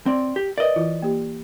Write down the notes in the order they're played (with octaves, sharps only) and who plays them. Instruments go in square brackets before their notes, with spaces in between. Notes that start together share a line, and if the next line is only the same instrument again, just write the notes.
[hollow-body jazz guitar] C4 D5
G4
[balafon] A#4 B4 [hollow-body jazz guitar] D5 D#5
[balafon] E3 E4 F4
A#3 G4